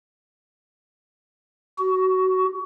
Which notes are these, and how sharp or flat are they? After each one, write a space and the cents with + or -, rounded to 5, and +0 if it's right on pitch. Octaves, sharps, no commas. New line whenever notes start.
F#4 +20